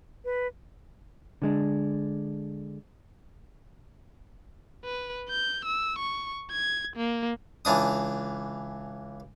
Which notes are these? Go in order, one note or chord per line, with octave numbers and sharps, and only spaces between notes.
B4
D3 G#3 D4
B4
G6
E6
C#6
G#6
A#3
C#2 E3 D4 D#6